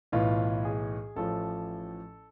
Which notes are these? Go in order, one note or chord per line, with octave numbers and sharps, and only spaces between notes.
B1 A2 E3 F4
G#4
A1 A2 F3 A4